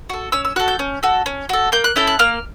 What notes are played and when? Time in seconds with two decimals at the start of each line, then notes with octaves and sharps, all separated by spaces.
0.10 F#4 A4
0.32 C#4 E6
0.45 E6
0.56 F#4 A4 F#6
0.68 G6
0.79 C#4
1.03 F#4 A4
1.26 C#4
1.49 F#4 A4
1.72 A#3 G6
1.84 F#6
1.96 C#4 E4 A4 G6
2.07 F#6
2.19 A#3 F6